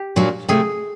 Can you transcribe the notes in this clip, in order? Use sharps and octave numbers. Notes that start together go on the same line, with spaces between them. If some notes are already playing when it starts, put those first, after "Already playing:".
Already playing: G4
A#2 F#3 A#3 D4
C3 F3 A3 G#4